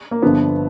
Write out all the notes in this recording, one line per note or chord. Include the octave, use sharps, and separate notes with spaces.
A#3
G1 G2 D3 F3 B3